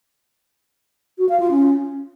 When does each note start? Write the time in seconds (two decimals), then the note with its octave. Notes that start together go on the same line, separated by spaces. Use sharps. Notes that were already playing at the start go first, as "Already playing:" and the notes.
1.18 F#4
1.29 F5
1.40 F4
1.51 C#4